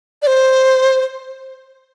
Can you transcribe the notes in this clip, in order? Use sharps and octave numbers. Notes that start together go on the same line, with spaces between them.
D5
C5